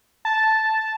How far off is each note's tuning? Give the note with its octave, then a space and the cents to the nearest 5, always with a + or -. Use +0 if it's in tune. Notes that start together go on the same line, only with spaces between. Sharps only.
A5 -5